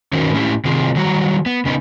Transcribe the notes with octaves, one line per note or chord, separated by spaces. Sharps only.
D#3 C#4 D#4 F#4 A#4 C5
A2 C#4 E4 G4
C3 D#3 C4 F4 G#4
D#3 F#3 G3 F#4 C#5 A#5
B3
C#3 B3 D4 D#4